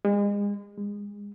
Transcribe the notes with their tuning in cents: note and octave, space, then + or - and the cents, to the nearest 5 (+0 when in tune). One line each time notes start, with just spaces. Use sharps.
G#3 -35
G#3 -25